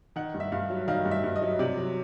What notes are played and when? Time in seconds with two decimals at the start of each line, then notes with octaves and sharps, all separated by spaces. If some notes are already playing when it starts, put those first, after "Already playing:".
0.16 D#3 F#5
0.34 G2
0.40 E5
0.52 G2 F5
0.70 F#3
0.88 D#3 F5
1.05 G2
1.11 E5
1.24 G2
1.36 D#5
1.42 F#3
1.59 C3 D5
1.77 F#3